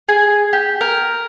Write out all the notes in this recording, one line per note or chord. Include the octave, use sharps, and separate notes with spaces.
G#4
G4
A#4